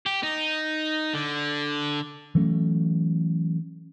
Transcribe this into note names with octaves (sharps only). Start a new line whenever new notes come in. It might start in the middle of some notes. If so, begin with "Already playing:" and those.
G4
D#4
D3
E3 F#3 A3 C#4